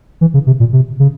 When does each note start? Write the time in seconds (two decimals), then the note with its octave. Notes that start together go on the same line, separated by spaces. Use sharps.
0.21 E3
0.34 C#3
0.47 C3
0.60 A#2
0.73 C3
1.00 C#3